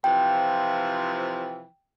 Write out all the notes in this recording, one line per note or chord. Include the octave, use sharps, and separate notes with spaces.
C3 E3 F3 G5